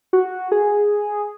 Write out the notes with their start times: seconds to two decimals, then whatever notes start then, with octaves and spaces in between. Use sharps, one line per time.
0.13 F#4
0.52 G#4